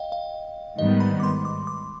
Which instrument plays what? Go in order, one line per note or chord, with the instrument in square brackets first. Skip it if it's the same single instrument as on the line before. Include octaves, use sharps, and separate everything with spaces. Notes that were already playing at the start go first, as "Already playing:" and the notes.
Already playing: [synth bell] D#5 F5 G5
F5
[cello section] G#2 D#3 G3 B3 [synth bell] D#5
[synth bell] B5
D6
C6
D6
D6